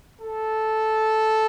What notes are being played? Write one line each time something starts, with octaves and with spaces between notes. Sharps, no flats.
A4